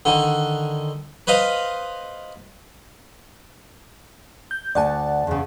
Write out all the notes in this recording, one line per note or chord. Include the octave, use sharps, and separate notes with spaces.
D3 D#3
B4 C5 D#5 F5 B5
G6
D2 D5 F#5 G#5 A5
E2 C#3